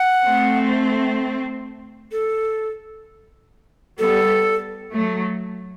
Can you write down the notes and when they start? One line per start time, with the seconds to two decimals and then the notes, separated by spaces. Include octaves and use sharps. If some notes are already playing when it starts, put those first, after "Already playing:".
Already playing: F#5
0.23 A3 C4
2.12 A4
3.98 G3 B3 A4
4.92 F#3 A3